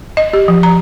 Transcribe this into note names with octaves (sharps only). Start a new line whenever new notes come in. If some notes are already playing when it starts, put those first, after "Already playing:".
D#5
G4
F3
A#5